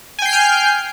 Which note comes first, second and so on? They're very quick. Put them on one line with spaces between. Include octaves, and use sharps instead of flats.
G#5 G5 C7 G6 F6